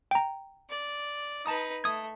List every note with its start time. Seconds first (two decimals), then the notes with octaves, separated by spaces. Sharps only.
0.11 G5 A#5
0.70 D5
1.46 D#4 B4 A5 A#5 D#6
1.84 A3 D#6 G#6